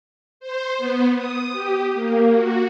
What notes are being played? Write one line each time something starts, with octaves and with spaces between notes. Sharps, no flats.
C5
B3
D#6
G4
A#3
F#4